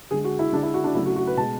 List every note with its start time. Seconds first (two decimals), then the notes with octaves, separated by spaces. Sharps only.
0.11 D3 G#3 G#4
0.25 F#4
0.39 E4
0.52 D3 G#3 D4
0.63 E4
0.74 F#4
0.84 D4
0.95 C#3 F#3 A3 E4
1.06 F#4
1.16 F#4
1.27 B4
1.37 B2 G#3 A5